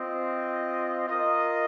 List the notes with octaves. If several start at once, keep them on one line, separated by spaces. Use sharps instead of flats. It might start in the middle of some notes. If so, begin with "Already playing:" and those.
Already playing: C4 F4 D#5
F4 A#4 D#5